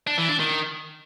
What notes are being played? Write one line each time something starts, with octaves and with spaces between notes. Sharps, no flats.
D4
E3
D4
D#3